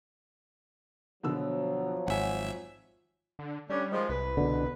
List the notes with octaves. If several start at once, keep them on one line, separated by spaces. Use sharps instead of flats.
B2 D3 F3 F#3 E6
G#1 E5 F#5 G#5
D3
G3 A3 C#4 D4
D#3 F3 G#3
C2 B4
B2 D3